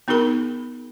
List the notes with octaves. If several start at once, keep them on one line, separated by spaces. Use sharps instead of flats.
B3 D#4 F#4 G#4 A#4 B5